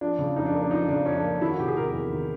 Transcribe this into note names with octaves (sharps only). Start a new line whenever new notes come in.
F3 D4
C#3
F2 D#4
D4
A#3
D4
F3 D#4
C#3 D4
F2 C#4
D4
A#3
D#3 E4
F#4
C3 G4
G#4
E2 A#4
E2
D#3